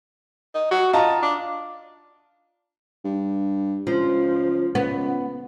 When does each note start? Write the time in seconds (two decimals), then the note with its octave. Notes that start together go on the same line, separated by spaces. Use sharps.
0.54 D#4
0.71 F#4
0.93 D#4 F4 A5 A#5
1.23 D4
3.04 G2
3.87 C#2 F3
4.75 C#2 B3